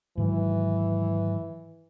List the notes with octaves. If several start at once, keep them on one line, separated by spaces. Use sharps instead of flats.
G#2 D#3 E3 F#3